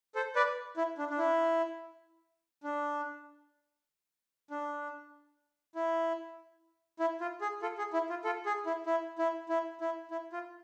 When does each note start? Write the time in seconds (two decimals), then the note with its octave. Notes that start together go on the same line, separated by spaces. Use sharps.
0.15 A4 C5
0.36 B4 D5
0.77 E4
0.98 D4
1.10 D4
1.18 E4
2.64 D4
4.51 D4
5.75 E4
6.99 E4
7.21 F4
7.41 G#4
7.62 F4 A4
7.78 G#4
7.93 E4
8.10 F4
8.24 F4 A4
8.46 G#4
8.66 E4
8.86 E4
9.19 E4
9.49 E4
9.81 E4
10.11 E4
10.33 F4